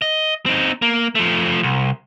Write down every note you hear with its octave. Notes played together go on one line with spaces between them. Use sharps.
D#5
C4 D#4
A#3
F3 A3
C2